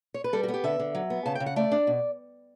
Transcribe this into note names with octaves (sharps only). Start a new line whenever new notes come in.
C#5
B4
G3 A4
F#4
B3
G4
D3 E5
D3
F#3
B3
C#3 A5
G5
C#3
F#5
A3 D5
D4
B2